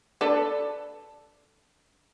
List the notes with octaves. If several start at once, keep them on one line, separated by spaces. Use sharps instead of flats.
D4 A4 B4